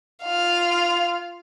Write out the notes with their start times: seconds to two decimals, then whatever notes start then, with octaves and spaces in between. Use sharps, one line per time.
0.24 F4 F5